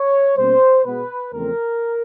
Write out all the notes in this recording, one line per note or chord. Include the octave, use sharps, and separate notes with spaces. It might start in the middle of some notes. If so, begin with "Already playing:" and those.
Already playing: C#5
B2 G3 A#3 C#4 C5
B2 G#3 B3 B4
E2 C#3 F3 A3 C4 A#4